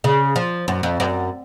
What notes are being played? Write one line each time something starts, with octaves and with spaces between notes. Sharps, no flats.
C#3
F3
F#2
F2
F#2